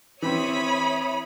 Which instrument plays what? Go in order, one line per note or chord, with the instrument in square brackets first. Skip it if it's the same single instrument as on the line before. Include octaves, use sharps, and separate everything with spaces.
[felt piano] E3 C4 [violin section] C#5 E5 D#6 [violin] B5